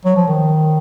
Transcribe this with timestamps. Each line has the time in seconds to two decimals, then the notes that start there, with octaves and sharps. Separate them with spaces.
0.05 F#3
0.16 F3
0.27 D#3